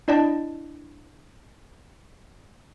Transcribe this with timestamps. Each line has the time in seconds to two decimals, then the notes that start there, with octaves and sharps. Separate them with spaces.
0.08 D4 E4 D5 D#5 G5 A5